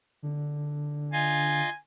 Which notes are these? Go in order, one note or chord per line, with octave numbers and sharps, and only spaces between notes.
D3
F4 D#5 F5 G#5